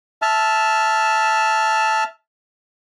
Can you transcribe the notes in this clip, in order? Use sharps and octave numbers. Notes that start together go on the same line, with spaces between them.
E5 A5 F6